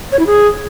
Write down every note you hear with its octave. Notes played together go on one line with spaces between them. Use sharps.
C#5
E4
G#4